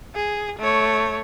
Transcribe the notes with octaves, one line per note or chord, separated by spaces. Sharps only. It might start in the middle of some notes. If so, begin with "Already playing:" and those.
G#4
A3 C#5